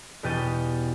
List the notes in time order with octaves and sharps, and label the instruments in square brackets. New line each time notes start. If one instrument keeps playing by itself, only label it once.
[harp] E2 B2 G4 G6 A6 D#7